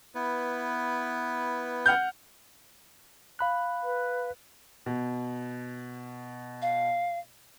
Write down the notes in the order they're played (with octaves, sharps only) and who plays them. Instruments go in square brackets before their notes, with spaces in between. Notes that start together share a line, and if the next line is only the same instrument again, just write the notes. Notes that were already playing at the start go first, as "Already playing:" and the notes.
[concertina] B3 E4 B4
[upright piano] F#5 F6 G6
[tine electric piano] F5 B5 F#6
[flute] B4
[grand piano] B2
[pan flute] F5